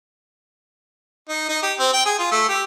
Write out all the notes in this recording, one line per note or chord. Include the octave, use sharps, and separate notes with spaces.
D#4
D#4
G4
C4
G5
G#4
F4
A3
G4